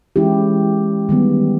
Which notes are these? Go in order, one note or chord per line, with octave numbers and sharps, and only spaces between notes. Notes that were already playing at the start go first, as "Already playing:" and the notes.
E3 G#3 C#4 E4 G4
D#3 G3 B3